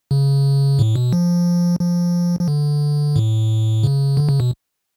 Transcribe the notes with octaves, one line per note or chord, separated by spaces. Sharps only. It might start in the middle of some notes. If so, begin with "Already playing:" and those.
C#3
A2
B2
F3
F3
F3
D3
A2
C#3
D3
C#3
B2